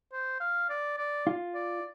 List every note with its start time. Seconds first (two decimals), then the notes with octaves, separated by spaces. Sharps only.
0.12 C5
0.40 F5
0.69 D5
0.97 D5
1.27 F4
1.55 D5